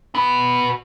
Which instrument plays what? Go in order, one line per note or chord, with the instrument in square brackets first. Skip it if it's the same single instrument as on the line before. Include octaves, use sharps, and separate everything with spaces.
[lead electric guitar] F#4 B4